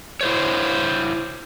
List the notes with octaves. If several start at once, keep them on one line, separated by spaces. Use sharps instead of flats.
E4 C5 C#5